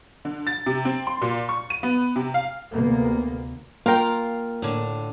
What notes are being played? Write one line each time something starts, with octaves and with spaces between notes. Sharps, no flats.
D3
A6
C3
C4
C6
A#2
C#6
D#7
B3
C3
F5
D2 C3 A#3 B3
A#3 F4 A#4 F5 G5 A#5
A2 D3